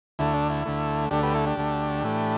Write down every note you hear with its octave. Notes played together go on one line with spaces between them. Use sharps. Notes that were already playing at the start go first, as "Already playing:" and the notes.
D2 D3 A3 E4
D4
E4
D2 D3 A3
D2 D3 A3 D4 G4
G4 B4
E4 A4
D4 G4
D2 D3 A3
A2 E3 A3